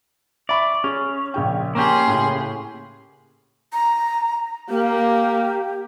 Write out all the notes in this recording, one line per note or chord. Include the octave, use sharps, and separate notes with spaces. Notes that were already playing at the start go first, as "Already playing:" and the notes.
D5 E5 B5 C#6
C#4 G#4
A#1 C#3 G5
A#3 C#4 G4 G#4 C6
A2 C#3
A#5
A#3 G4